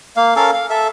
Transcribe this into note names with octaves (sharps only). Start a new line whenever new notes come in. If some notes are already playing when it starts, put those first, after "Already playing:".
A#3 F5
C#4 A4 A#4 F5
F5
A4 E5